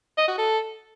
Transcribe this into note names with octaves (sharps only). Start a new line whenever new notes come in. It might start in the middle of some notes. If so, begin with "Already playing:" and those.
D#5
F#4
A4